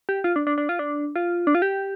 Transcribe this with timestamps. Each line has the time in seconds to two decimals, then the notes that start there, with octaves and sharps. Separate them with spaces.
0.09 G4
0.24 F4
0.36 D4
0.47 D4
0.58 D4
0.69 F4
0.79 D4
1.16 F4
1.47 D4
1.55 F4
1.62 G4